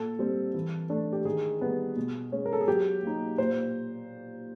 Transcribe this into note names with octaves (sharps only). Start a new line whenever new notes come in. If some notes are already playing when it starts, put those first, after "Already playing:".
Already playing: A#2 A4
G3 C4
E3
A3 D4
G4
D#3 G#4
G3 B3
B2
G#3 C#4
A#4
A4
G#4
F#3 G4
A#3 D#4
A#2 C5